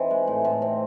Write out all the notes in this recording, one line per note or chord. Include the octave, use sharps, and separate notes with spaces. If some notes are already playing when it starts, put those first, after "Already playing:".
Already playing: E3 C4 D#4
G#3
A2
A2
C4